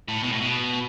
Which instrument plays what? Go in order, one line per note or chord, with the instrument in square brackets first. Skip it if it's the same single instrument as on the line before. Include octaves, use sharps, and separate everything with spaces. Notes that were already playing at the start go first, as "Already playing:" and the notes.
[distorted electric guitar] A2
B2
A2
B2